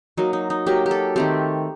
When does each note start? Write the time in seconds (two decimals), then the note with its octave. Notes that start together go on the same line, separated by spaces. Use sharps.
0.17 F#3 A#3 D#4
0.33 D#4
0.50 D#4
0.66 F#3 A#3 G4
0.86 G4
0.91 A4
1.16 D#3 A3 C4 G4